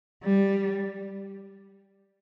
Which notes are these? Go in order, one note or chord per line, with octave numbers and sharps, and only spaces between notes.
G3